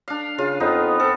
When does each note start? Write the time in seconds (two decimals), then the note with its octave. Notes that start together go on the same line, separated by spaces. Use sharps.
0.08 D4 F5
0.38 C#3 F4
0.60 F2 B3 D#4
1.00 C4 A4